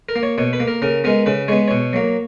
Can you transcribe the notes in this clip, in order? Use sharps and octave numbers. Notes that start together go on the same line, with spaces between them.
A#4
A#3
C#5
B2 C#5
B4
A#3
A#4
C#3 A#4
G#3 B3 A#4
C#3 B4
G#3 B3 C#5
B2 C#5
F#3 A#3